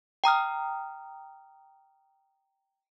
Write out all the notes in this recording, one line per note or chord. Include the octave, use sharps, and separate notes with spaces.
G5 A#5 D#6 F6